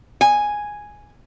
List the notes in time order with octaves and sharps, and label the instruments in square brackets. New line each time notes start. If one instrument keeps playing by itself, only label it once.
[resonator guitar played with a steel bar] G#5